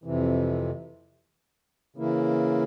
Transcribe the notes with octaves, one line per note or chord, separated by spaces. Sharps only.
F2 C3 E3
C#3 E3 A#3 E4